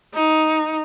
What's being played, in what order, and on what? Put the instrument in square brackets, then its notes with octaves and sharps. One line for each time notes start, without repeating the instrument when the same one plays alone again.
[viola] D#4